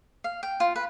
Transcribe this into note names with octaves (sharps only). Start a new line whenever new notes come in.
F5
G5
F4
B4